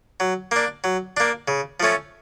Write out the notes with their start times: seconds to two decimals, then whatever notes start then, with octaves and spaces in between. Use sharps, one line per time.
0.20 F#3
0.51 A#3 D4
0.84 F#3
1.17 A#3 D4
1.48 C#3
1.80 F3 A3 C#4